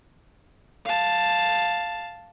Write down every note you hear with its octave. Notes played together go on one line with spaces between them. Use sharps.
F5 A5